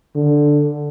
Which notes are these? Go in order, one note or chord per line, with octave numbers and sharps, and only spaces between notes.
D3